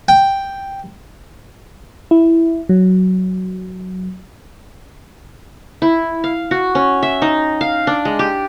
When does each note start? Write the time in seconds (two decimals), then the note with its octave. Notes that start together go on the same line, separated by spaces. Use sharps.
0.08 G5
2.11 E4
2.69 F#3
5.82 E4
6.24 F5
6.51 F#4
6.75 C#4
7.03 E5
7.22 D#4
7.61 F5
7.87 D4
8.05 G#3
8.19 G4